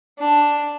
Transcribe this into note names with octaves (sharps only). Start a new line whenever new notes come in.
D4